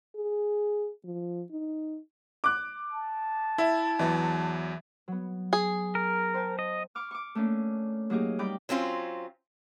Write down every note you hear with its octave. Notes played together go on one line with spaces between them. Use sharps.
G#4
F3
D#4
D6 F#6
A5
E4 E5
E2 E3 F#3
F#3 B3
G#4
A#4
C5 G5 A5
D#5
C#6 D6 F6
C#6 D6
A3 A#3 C#4 D4
F#3 A#3 D#4 G4 G#4
G3 D#4 G5 B5 D6 G6
F#3 C4 C#4 F4